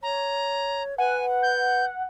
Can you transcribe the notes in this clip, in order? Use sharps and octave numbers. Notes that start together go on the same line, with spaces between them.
C#5 A#5
B4 F#5 G#5
G6